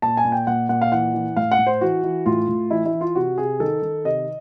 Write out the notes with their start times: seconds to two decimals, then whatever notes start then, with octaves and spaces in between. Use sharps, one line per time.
0.02 A#2 A5
0.17 G#5
0.25 A#2
0.32 G5
0.47 A#2 F#5
0.69 A#2 F#5
0.82 F5
0.92 E3 F#5
1.14 E3
1.36 A2 F5
1.51 F#5
1.59 A2
1.67 C5
1.81 E3 F#4
2.04 E3
2.26 A2 F4
2.48 A2
2.71 E3 E4
2.86 E4
2.93 E3
3.01 F4
3.15 C3 F#4
3.38 C3 G#4
3.60 D#3 A4
3.82 D#3
4.05 C3 D#5